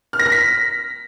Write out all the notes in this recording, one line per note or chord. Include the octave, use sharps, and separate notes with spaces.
F6
A#6
F6
B6